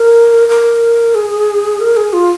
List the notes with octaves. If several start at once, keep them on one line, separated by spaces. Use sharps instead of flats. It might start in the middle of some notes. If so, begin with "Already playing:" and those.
Already playing: A#4
A#4
G#4
A#4
G#4
F4